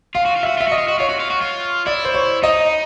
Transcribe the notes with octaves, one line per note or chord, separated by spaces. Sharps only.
F4 F5
F#4
F4
F#4 E5
F4 E5
F#4 D#5
F4
F#4
F4 C#5
F#4
F4
F#4
F4
E4 D5
C5
C#5
D#4 D#5